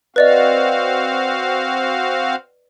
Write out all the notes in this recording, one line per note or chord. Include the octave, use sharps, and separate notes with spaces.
C4 F#4 B4 D5 D#5 F5